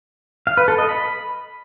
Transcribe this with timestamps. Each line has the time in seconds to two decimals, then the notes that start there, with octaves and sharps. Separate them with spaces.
0.47 F5
0.57 B4
0.68 A4
0.78 D#5
0.89 B5